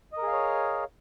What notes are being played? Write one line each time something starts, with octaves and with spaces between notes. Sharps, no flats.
G#4 A#4 C#5 D#5 F5